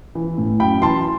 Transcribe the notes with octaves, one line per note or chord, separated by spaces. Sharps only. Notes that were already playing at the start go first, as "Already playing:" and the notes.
E3
A2
F#2 G5 B5
E3 A5 C6